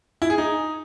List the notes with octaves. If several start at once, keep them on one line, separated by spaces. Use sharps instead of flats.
E4
G#4
D#4